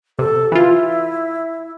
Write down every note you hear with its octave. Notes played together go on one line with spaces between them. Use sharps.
C3 A4
E3 E4 F4